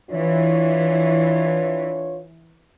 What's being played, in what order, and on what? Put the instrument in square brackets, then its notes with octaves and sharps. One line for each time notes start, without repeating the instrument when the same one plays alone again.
[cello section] E3 [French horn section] D4 F4 C#5